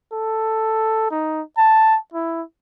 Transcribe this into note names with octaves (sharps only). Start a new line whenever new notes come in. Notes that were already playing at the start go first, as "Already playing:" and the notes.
A4
D#4
A5
E4